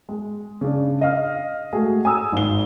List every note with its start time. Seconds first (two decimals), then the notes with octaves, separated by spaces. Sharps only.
0.09 G#3
0.61 C#3 D4
1.01 D#5 F5 F6
1.73 G#3 A3 F#4 G#4
2.05 G#5 A#5 D#6 E6
2.32 G#1 G#2 G7